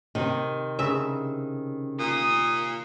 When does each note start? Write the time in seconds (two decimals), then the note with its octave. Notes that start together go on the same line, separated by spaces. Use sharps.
0.15 C3 D#3
0.79 C#3 E5
2.00 A#2 D#6